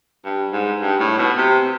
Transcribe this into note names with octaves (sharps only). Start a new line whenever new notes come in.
G2
G#2
G2
A2
B2
C3